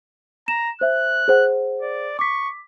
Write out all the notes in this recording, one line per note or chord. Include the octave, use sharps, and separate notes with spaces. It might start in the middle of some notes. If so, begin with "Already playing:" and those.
A#5 E7
C5 E5 F#6
G#4 C5 F#5
D5
C#6 D6 B6